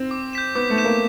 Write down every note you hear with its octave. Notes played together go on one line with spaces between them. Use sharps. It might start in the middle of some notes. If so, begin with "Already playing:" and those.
Already playing: C4
D6
G6 B6 E7
B3 D6
A3
G6 B6 E7
A#3